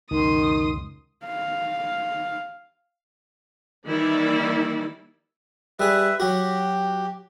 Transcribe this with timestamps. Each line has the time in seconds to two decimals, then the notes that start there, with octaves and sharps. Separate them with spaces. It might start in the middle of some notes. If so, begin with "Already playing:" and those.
0.11 C#2 F#2 B2 D#3 C6 D#6
1.26 F5
3.86 D#3 E3 G3 A#3 E4 D5
5.80 G3 G#4 B4 E5
6.20 F#3 F#4 G4